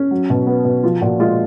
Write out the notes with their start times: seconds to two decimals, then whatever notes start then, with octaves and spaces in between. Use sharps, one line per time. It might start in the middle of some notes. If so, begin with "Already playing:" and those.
Already playing: C#4
0.11 F#3
0.30 B2
0.47 B3
0.65 B2
0.84 F3 F4
1.01 A#2 F#4
1.19 G#3 F4